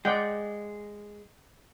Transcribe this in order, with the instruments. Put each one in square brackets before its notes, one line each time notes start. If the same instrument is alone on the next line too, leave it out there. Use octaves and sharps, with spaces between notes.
[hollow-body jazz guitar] G#3 [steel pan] D5 F#5 G5